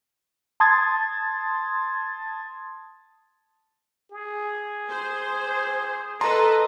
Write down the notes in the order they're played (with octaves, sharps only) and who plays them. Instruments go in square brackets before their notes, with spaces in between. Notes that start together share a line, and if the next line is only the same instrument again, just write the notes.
[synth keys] A5 C6 D#6 G#6 A6
[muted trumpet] G#4
[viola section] C5
[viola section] A4 B4 D#5 [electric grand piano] A5 A#5 C6